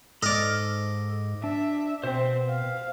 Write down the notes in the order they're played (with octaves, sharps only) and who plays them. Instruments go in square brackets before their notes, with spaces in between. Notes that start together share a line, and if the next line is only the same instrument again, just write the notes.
[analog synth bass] G#2 [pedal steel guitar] A4 F6 [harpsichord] D5 D#5
[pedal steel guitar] D4 [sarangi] E5
[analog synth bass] B2 [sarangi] C4 [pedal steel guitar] C5 E5
[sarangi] F5